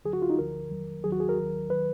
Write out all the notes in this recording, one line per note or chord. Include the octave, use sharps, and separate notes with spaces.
D2 D3 F#3 G#4
F#4
F4
D#4
D2 D3 F3 A#4
F2 D#3 F#3
D#2 D#3 F#3 G#4
F#4
G#4
A#4
D#2 D#3 F#3
D#3 F#3 B4